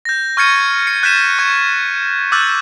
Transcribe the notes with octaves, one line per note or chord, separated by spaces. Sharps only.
G6 A#6
C#6 F6 G#6 A6 C#7 D#7
C#7
F#6 G6 A6 B6 D#7 E7
C#6 G#6
D6 E6 F#6 G6 A6